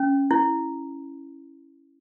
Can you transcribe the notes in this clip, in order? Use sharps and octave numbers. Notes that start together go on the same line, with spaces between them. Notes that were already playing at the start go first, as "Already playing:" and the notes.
Already playing: C#4
E4